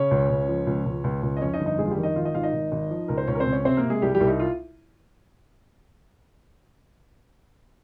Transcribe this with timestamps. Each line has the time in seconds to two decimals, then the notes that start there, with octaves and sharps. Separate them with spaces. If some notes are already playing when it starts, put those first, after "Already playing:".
Already playing: C#3 C#4 C#5
0.11 C#2
0.30 C#2
0.48 F3
0.67 C#2
0.86 C#2
1.04 C#2
1.23 C#2
1.37 D#5
1.41 F2 C#4 C#5
1.54 D#4 D#5
1.60 G1
1.66 D#4 D#5
1.79 F2 G#3 G#4
1.85 F4
1.91 G3 G4
1.97 D#3
2.03 D#4 D#5
2.16 G#1 F4 F5
2.25 D#4 D#5
2.35 G#1 F4 F5
2.43 D#4 D#5
2.53 G#1
2.72 G#1
2.90 F3
3.08 C#2 A#4
3.18 C5
3.27 C#2 C#4 C#5
3.35 A#4
3.40 C4 C5
3.46 C#2
3.52 C#4 C#5
3.65 C3 C4 C5
3.77 A#3 A#4
3.83 C3
3.90 G#3 G#4
4.02 C2 G3 G4
4.15 G3 G4
4.21 C2
4.27 D#4
4.40 F4